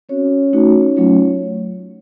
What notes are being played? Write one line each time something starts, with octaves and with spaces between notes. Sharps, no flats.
C4 C#4 F#4 C#5
A3 D#4 F#4
F#3 A3 C#4 F4